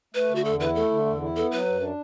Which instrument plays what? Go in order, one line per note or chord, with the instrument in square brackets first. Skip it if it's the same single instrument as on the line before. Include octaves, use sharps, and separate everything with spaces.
[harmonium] A3 [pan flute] B4
[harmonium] D3
[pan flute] F#4
[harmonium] E2 [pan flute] A4
[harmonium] E4 [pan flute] B4
[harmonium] A3 [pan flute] A4
[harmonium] D3
E2
E4
[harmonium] B3 [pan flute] A4
[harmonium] F#3 [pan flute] B4
[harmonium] F#2
D4